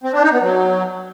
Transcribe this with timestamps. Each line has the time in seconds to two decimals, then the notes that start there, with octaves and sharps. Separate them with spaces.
0.04 C4
0.13 D4
0.23 D#4
0.33 B3
0.42 F#3